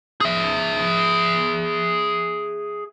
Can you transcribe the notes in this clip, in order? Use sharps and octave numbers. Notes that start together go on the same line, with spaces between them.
G#4 E5